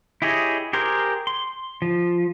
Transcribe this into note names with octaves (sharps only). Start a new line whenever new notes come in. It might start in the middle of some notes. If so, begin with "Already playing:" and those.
E4 G4 G#4 C#5 D#5
G4 G#4 A#4 C5
C6
F3